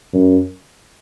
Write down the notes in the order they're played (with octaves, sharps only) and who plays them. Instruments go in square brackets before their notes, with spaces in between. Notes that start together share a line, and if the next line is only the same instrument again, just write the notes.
[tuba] F#2